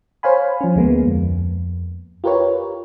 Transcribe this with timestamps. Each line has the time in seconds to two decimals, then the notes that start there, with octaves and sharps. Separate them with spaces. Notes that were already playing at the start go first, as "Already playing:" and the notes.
0.23 C5 C#5 F5 G#5 B5
0.61 F3 C#4
0.76 D2 G#3 A#3 B3
1.07 F2
2.24 F4 G4 A#4 B4 C#5